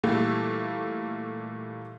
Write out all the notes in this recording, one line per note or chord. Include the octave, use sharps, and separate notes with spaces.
A#2 E3 G3 A3 A#3